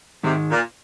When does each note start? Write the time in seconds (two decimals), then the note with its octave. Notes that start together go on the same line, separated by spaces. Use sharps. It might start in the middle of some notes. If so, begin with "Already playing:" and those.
0.23 G#2 C3 D#3 G#3
0.51 A#2